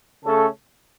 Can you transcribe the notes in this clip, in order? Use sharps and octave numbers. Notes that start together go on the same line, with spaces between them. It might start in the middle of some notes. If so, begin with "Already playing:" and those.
C#3 A3 C#4 A4